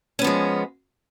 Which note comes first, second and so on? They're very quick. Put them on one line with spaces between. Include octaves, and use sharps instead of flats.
C#4 B3 F3 G#3